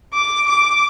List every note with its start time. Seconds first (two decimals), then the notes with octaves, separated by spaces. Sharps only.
0.14 D6
0.48 D6